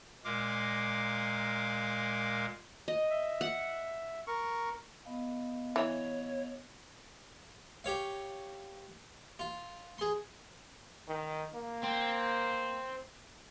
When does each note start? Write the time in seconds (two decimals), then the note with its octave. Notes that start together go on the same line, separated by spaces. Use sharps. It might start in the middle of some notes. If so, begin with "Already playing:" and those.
0.24 A#2 G#3 A#4 F5 D6
2.88 D#5
3.10 E5
3.41 F#5
4.27 A#4 C#6
5.05 B3 D#5 F5
5.76 E3 C#5
7.84 G4 C#5 F5
9.39 F4
9.98 G#4 C6
11.08 D#3
11.54 A#3
11.84 C4